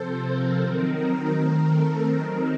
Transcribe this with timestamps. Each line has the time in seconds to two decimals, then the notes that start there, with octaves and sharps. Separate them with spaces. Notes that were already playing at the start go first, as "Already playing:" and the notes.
Already playing: C3 F3 C4 A4 C5
0.23 A#4
0.59 D#3 F#3 C4 D#4 A#4
1.33 D#3 A3 C4
1.68 A4
2.05 D#3 F#3 C4 D#4 A#4